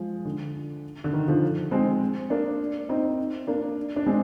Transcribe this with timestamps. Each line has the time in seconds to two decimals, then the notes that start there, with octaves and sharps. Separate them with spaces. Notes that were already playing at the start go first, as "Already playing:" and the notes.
Already playing: F3 G#3
0.25 D3
1.04 D3
1.13 D#3
1.28 D3 F3
1.71 G#3 C4
2.30 A#3 D4
2.89 C4 D#4
3.47 A#3 D4
3.96 D4
4.06 G#3 C4